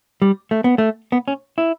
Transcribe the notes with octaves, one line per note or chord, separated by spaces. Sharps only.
G3
A3
B3
A3
B3
C#4
E4